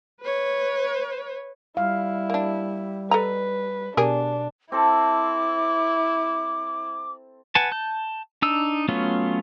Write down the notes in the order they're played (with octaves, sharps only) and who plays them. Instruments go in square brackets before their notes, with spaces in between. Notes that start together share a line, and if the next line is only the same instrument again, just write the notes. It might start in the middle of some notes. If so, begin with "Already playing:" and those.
[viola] B4 C#5
[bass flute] G3 [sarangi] E4 [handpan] F5
[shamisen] A#3 D4
[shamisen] A4 D#5 A#5 [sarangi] B4
[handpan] B2 [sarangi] D4 [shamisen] G4 G#4 A#4
[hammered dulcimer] C4 A4 [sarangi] E4 [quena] D6
[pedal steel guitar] B4 F#5 G#5 A5
A5 G6
D4 D#4 E6
F#3 A3 B3 C#4 F4